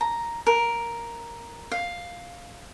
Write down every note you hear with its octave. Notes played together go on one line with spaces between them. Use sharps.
A#5
A#4
F5